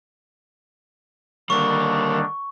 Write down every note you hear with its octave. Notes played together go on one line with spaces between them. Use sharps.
D3 D#3 G3 A#3 D4 C#6